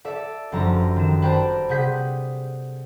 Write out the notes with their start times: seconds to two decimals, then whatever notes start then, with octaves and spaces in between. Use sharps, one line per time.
0.05 A4 D5 E5
0.52 G1 F#2 F3 A4 A#5
0.96 D#3 E7
1.22 B4 C5 D5 G5 A5 A#5
1.69 C3 G#4 F#5 G6 B6